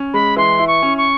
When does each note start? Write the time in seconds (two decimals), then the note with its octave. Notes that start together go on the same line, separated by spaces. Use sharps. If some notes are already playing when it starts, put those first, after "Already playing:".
Already playing: C#4
0.14 G#3 B5
0.36 E3 C6
0.59 E4
0.67 C#6
0.82 C#4
0.97 C#6